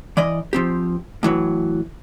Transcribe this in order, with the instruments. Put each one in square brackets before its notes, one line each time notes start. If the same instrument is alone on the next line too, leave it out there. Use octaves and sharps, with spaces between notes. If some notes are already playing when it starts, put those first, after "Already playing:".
[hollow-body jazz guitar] E3 D5 D#5
F3 C4 G4
A2 E3 F#3